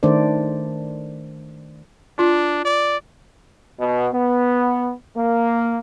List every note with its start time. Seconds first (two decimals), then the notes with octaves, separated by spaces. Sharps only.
0.03 D#3 A3 D4 C5 D5
2.19 D4 F4
2.65 D5
3.79 B2
4.13 B3
5.16 A#3